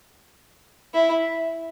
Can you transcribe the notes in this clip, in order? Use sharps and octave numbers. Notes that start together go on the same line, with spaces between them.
E4